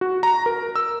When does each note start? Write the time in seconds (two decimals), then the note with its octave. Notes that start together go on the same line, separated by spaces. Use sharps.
0.01 F#4
0.23 A#5
0.46 A#4
0.76 E6